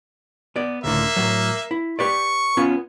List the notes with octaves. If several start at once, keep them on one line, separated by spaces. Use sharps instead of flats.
B3 D5
C#2 A2 D3 A#3 E5
A2 F#3
E4
G4 B4 D5 C#6
B3 C#4 F4